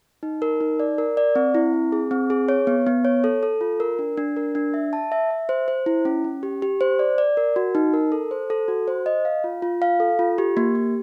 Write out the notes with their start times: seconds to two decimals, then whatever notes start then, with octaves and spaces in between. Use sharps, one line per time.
0.23 D#4
0.42 A#4
0.60 D#4
0.80 D5
0.98 A#4
1.17 D5
1.36 C4
1.54 E4
1.73 C4
1.92 G#4
2.11 C4
2.30 G#4
2.49 C#5
2.67 B3
2.87 B3
3.05 C#5
3.24 A4
3.43 A4
3.61 F4
3.80 A#4
3.99 D4
4.18 D4
4.37 A#4
4.55 D4
4.74 E5
4.93 A5
5.12 E5
5.31 E5
5.49 C5
5.68 C5
5.86 E4
6.05 C#4
6.24 C#4
6.43 G4
6.62 G4
6.81 C5
6.99 D5
7.18 D5
7.37 A#4
7.56 F#4
7.75 D#4
7.93 A#4
8.12 A4
8.31 C5
8.50 A4
8.68 F#4
8.88 C5
9.06 D#5
9.25 F5
9.44 F4
9.62 F4
9.82 F5
10.00 A4
10.19 F4
10.38 G4
10.57 A#3
10.75 G4